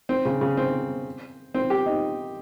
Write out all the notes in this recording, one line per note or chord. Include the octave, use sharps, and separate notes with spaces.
C4
C#3
C#3
C4
C4
G4
D#4